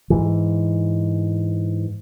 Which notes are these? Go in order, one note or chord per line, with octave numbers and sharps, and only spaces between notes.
G#2 E3